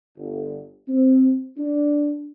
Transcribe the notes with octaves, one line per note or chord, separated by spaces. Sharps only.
G1
C4
D4